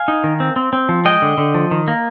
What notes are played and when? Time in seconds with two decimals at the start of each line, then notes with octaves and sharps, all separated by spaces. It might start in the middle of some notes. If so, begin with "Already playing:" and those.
Already playing: F5 G#5
0.08 D#4
0.24 D#3
0.40 C4
0.56 C4
0.73 C4
0.89 F3
1.05 G#3 D#5 G5
1.22 D3
1.38 D3
1.54 F3
1.71 D#3
1.88 A#3